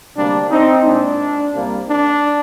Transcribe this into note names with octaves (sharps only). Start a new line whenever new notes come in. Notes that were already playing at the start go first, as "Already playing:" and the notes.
D2 C3 G3 A#3 D4
C4 D#4
A#2 G#3 D4
C2 C3 G3 A#3
D4